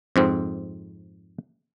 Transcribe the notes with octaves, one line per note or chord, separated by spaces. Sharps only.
F2 G#2 C4